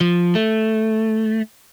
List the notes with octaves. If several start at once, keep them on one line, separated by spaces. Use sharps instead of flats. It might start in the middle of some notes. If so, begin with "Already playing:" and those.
F3
A3